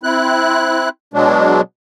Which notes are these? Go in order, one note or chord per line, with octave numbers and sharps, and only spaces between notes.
C4 E4 F#6
B2 F#3 G#3 D4